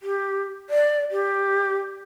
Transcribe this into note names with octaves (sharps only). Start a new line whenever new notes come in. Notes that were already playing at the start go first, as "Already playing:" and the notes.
G4
D5
G4